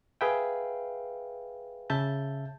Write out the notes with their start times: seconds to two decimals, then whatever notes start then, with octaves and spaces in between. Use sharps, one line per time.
0.21 G#4 B4 E5 F5 G5
1.90 C#3 E5 A5 G6